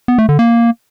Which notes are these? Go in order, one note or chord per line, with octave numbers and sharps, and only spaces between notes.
B3
A3
D3
A#3